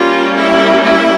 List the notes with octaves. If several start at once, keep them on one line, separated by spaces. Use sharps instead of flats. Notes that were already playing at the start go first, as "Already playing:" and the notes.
Already playing: G3 A#3 C#4 F4
E4
E4